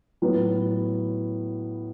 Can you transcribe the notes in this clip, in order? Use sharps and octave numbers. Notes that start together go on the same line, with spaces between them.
A2 F#3 B3